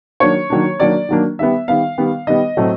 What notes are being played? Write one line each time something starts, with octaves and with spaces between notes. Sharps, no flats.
D#3 F#3 A#3 D4 C#5
D#3 F#3 A#3 D4
D#3 F#3 A#3 D4 D5
D#3 F#3 A#3 D4
D#3 G3 B3 E5
D#3 G3 B3 F5
D#3 G3 B3
D#3 G3 B3 D#5
A2 F#3 A3 C4